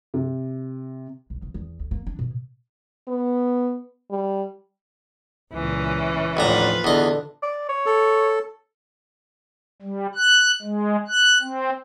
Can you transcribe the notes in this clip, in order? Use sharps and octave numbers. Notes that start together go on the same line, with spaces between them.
C3
B1
C#2
E2
D2
A#3
D4
B2
B3
G3
C#2 A#2 E3 C#4
A1 D#2 D3 F3 F4 B4 A#5
E2 D3 D4 D#5
D5
C#5
A4
G3
F#6
G#3
F#6
C4